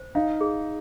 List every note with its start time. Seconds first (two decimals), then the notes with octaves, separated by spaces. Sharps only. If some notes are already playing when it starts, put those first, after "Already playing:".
Already playing: C5
0.15 D#4 F5
0.41 G#4